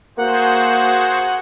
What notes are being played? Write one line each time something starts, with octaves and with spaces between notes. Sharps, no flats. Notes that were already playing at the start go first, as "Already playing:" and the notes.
A#3 F#4 G#4 C5 F#5